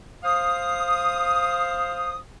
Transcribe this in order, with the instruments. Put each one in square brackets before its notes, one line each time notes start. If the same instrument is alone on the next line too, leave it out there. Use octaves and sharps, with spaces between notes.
[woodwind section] C5 F5 D#6